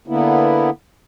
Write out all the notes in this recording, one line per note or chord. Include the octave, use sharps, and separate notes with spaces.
D3 A#3 B3 E4